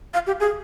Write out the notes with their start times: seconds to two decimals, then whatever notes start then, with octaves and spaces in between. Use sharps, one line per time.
0.14 F5
0.27 G4
0.40 G#4